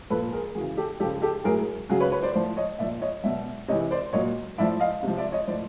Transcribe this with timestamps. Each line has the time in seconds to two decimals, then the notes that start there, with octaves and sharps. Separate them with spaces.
0.10 A#2 F3 A4 B4
0.32 G#4 A#4
0.55 C#3 E3 F#4 G#4
0.77 G4 A4
1.00 C#3 F3 G4 A4
1.22 G4 A4
1.44 A2 F#3 G#4 A#4
1.89 C#3 F#3 F#4 G#4
2.00 B4 C#5
2.12 B4 C#5
2.22 C5 D5
2.34 A2 F3 C5 D5
2.57 C#5 D#5
2.79 A#2 D5 E5
2.82 F3
3.02 C#5 D#5
3.23 B2 F#3 D5 E5
3.68 C3 C#5 D#5
3.72 E3
3.91 C5 D5
4.13 A#2 F#3 C#5 D#5
4.58 A2 F3 D5 E5
4.80 D#5 F5
5.03 C3 F3
5.18 D5 E5
5.32 C#5 D#5
5.47 F3 C5 D5
5.51 A2